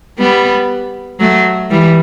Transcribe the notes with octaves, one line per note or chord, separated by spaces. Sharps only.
G3 B3
F#3 A3
E3 G3